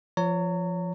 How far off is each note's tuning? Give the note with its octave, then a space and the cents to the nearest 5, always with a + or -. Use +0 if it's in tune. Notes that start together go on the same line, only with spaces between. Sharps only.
F3 -10 C#5 +20 A#5 -35